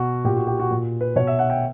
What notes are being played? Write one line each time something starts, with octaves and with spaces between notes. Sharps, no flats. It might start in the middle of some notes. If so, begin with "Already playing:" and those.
Already playing: B2 F#4
A#2 G4
F#4
G4
F#4
A#2
B4
B2 C#5
E5
F#5
G5